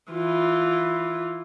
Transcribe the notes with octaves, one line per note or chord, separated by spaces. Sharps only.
E3 F4